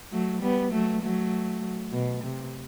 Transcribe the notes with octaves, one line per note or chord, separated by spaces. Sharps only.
F#3 A3
G3 B3
F#3 A3
F#3 A3
B2
C3